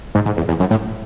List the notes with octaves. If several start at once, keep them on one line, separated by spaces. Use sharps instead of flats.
G#2
G#2
E2
E2
F#2
A2